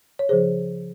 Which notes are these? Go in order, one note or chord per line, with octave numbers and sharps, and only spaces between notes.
C#5
C#3 F3 G#4 C5